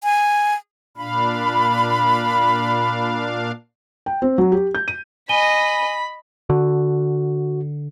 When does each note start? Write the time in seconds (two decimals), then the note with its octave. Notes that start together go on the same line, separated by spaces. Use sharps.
0.04 G#5
0.97 A#2 D4 F5 B5
4.06 G5
4.22 C4
4.38 F#3
4.52 G4
4.75 G6
4.88 D#7
5.29 D#5 G#5 B5 D#7 G7
6.50 D3 F#4